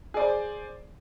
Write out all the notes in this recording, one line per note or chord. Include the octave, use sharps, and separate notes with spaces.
G#4 C5 D5